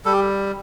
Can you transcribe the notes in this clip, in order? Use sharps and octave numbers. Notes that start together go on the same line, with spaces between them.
G3 A4
G4